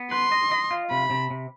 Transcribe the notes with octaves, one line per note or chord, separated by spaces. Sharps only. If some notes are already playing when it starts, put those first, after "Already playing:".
Already playing: B3
B4 C6
D#5
D#5
F4
C3 B5
C3
C3